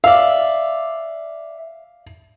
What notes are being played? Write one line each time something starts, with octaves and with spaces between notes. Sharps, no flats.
D5 E5 F5